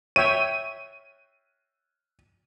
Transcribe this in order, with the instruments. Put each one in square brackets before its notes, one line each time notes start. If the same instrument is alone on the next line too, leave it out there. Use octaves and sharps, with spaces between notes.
[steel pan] C#5 E5 G5 [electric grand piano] D#7